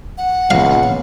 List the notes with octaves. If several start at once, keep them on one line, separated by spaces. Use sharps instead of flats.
F#5
C#2 A#2 B3 F5